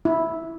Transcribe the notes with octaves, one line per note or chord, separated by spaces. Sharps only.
E4